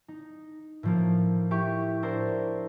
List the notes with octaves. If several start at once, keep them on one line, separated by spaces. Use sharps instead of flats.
D#4
A2 F3 A#3
E4 G4 E5 C#6
D4 E4 A#4 C5